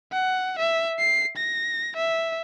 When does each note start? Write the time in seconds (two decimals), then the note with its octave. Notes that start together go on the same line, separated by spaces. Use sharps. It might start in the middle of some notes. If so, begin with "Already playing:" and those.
0.13 F#5
0.59 E5
0.99 C7
1.37 A#6
1.96 E5